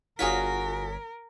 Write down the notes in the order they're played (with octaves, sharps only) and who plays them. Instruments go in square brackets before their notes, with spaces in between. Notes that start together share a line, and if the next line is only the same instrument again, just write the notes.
[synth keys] G1 C#5 B6 [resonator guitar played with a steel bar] F4 F#4 G#4 [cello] A#4